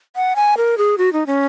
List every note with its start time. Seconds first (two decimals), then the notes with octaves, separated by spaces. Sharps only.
0.16 F#5
0.36 G#5
0.57 A#4
0.78 G#4
0.98 F#4
1.13 D#4
1.27 C#4